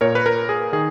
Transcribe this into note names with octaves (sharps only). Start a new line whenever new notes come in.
A#2 A#4 C#5
B4
A#4
G#4
D#3 G#4